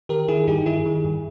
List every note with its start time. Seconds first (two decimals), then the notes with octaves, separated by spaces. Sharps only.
0.09 D#3 G4 A#4
0.28 D#3 E4 G#4
0.47 G2 D#4 G4
0.66 D#3 E4 G#4
0.85 D#3
1.04 G2